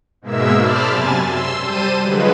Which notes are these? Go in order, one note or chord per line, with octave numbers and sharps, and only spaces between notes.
G#2 B2 G#3 A#3 E5 E6
C5 D5 A5 B5 F6
F#2 C3 G#5 A6
C6 E6
G3 C5 A5 D#7
D3 F3 F#3 G#3 B4